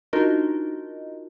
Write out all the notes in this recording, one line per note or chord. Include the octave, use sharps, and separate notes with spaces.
D4 D#4 F4 F#4 A#4 D#5